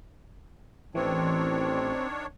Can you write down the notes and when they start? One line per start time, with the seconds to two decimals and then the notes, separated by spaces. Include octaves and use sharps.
0.95 A1 D#3 E3 C4 D4 C#5